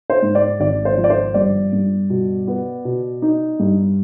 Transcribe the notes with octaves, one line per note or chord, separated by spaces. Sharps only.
C5
G#2
D5
G#1 D5
C5
F3
D5
C5
G2 D5
G2
B2
B3
B2
D#4
G2